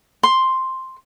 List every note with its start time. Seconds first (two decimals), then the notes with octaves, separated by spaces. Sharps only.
0.23 C6